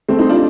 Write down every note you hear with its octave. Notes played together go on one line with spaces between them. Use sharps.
A3 C4
C4 D#4
D4 F4